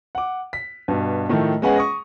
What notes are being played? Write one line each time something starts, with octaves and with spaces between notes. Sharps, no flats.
F#5 D6
B6
G2 B2
A2 D#3 F3 A3
G#3 B3 C#4 G#4 B4 F#5
C#6 D#6 A#6